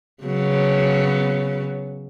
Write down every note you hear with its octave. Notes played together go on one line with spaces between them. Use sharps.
C#3 F#3 B3